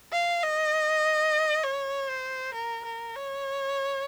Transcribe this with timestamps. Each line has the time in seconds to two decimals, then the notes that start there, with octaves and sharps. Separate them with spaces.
0.12 F5
0.42 D#5
1.63 C#5
2.09 C5
2.54 A#4
2.85 A#4
3.15 C#5